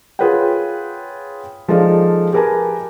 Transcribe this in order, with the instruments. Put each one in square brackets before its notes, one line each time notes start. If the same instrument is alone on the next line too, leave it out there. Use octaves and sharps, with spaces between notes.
[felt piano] F4 G#4 B4 C#5 F#5 G5
F3 G#3 D#4 A4 D5 F5
G4 G#4 A#4 B4 G#5 A5